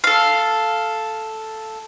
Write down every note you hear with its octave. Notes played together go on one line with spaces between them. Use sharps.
A4 F5